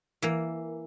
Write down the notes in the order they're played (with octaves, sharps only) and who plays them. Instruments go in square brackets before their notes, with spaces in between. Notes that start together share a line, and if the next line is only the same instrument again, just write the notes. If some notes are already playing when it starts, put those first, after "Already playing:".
[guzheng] E3 A#3